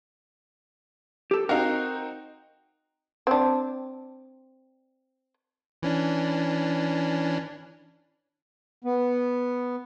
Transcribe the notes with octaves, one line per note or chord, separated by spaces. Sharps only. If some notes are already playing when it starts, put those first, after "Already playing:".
G4 A4
C4 D#4 F#4 A#4 F5
C4 D4
E3 C#4 D4
B3